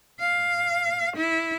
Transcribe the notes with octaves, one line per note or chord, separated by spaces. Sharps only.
F5
E4